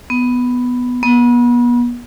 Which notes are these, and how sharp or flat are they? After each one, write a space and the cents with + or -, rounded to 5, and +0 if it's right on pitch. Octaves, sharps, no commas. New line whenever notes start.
B3 +0
B3 -35